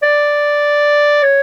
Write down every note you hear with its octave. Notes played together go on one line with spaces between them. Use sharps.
D5
C#5